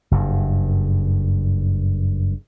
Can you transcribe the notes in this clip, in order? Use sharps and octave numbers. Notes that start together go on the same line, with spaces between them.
F#1 G2